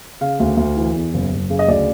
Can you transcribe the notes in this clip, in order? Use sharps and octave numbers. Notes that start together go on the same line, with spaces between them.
C#3 F5
D2
D2
E3
E2
F#1
F#1
C#3
D#5
D2 D5